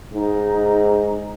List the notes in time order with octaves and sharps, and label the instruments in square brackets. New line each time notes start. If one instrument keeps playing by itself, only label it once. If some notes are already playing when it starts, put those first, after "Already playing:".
[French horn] G#2 [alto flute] D#4